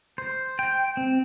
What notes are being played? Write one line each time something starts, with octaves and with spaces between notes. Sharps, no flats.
C5
G5
C4